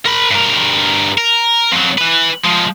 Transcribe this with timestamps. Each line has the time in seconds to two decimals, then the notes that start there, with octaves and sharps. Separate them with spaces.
0.06 A#4 B5
0.31 G2 A#4
1.18 A#4
1.72 F2 F#3
1.98 E3 B4
2.44 F3 G#3